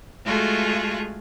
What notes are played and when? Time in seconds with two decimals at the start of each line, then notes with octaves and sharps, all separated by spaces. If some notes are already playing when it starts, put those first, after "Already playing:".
0.25 G#3 A3 F4 F#4 G#4 A4